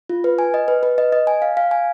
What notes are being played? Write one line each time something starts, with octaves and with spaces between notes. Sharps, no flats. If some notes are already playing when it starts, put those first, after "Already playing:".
F4
B4
G#5
D#5
B4
B4
D#5
D#5
G#5
F5
F5
G#5